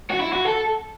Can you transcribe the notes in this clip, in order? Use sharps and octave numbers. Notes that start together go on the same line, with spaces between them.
F#4
E4
F#4
A4